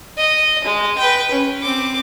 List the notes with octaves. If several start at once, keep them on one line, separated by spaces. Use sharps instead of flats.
D#5
G#3
B4 G5
C#4
C4 D6